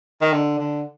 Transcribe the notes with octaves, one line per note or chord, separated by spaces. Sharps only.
D#3
D3
D3